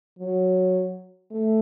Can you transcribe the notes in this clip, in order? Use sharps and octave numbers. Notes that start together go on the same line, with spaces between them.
F#3
A3